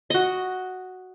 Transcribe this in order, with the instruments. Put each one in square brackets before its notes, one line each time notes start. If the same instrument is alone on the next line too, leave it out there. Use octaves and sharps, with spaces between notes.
[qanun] F#4 D#5